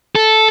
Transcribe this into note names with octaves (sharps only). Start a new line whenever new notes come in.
A4